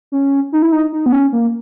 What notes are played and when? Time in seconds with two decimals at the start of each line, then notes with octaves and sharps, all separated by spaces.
0.12 C#4
0.52 D#4
0.62 E4
0.72 D#4
0.93 D#4
1.06 B3
1.12 C#4
1.32 A#3